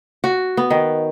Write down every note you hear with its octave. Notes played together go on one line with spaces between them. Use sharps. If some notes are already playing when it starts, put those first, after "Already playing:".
F#4
B3
D#3